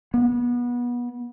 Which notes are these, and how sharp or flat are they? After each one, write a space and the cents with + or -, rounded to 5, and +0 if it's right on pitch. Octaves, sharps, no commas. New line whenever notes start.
B3 -25